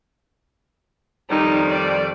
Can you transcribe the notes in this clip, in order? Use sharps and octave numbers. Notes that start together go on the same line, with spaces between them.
F2 D#3 G3 D#4
D5